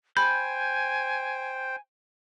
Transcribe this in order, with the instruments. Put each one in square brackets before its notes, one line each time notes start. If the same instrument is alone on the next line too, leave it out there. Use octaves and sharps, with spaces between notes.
[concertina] C5 G5 [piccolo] G#5 [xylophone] B5 [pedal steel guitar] G6